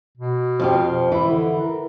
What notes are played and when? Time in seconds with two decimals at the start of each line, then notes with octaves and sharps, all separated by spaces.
0.17 B2
0.60 F2 F3 G4
1.12 E3 E4
1.30 D3
1.61 A#4